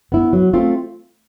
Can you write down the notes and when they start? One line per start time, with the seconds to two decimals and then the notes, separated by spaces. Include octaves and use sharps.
0.12 B3 E4
0.33 F#3
0.53 A3 C4 F4